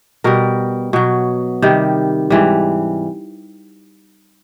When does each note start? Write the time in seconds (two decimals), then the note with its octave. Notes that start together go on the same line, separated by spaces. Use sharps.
0.24 B2 G3 A#4
0.93 B2 F#3
1.62 C3 D#3 G3
2.30 G#2 E3 G3